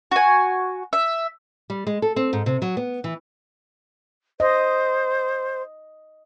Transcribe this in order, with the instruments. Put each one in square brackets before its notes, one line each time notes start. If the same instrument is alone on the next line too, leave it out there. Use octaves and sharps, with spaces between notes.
[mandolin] F#4 G#5
E5
[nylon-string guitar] G3
G#3
A4
C4
G#2
C3
F#3
B3
E3
[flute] C5 [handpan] D#5